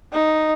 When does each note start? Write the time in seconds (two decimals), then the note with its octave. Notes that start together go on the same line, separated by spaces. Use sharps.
0.13 D#4